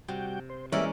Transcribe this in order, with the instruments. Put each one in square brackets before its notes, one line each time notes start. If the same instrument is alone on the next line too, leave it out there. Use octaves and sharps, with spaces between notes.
[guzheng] C3 [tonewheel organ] G3 F#4 G5
[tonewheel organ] C5
[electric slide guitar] E3 G#3 [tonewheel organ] G3 A#3 [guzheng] C#4 A#4 D5 [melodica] E5